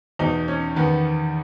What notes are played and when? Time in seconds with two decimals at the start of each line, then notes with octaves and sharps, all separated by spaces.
0.19 E2 B2 D#4
0.48 C#4
0.76 E2 D#3 B3